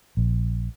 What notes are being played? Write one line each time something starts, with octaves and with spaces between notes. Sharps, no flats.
A#1